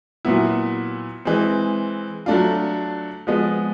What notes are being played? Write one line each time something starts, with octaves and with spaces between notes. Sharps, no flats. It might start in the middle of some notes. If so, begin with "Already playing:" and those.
A#2 F#3 B3 E4
E3 G#3 C4
F#3 A3 D4 F4
F3 G#3 B3